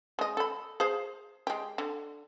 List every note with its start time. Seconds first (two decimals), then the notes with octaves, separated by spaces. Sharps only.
0.19 G#3 D#5
0.37 A4 B5
0.80 G#4 C5 F5
1.47 G#3 G4
1.78 D3